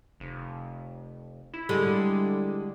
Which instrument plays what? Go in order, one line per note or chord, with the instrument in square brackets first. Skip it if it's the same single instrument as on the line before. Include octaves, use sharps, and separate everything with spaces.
[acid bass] F1
E4
[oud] D3 G3 G#3